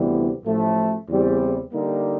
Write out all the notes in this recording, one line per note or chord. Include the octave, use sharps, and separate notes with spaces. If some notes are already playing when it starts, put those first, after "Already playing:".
Already playing: D2 C3 E3 G3 B3
A1 A2 F3 A3
E2 C#3 E3 G3 C4
D3 G3 A#3 D#4